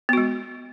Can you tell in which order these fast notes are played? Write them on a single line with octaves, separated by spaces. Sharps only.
B3 F#4 G#3